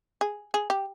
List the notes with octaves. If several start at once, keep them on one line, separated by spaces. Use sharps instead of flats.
G#4
G#4
G4